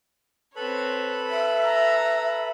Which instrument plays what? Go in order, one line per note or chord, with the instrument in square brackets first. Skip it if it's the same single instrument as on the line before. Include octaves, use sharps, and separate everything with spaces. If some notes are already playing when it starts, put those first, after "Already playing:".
[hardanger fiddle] C4 C#5 [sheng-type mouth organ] A4 B4 B5
[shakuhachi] E5
[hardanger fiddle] A#5